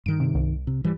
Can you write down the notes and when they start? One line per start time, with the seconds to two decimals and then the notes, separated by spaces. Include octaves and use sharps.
0.06 G2 D#3 D7
0.20 C3
0.35 C2
0.67 C3
0.84 G#2 E3 G3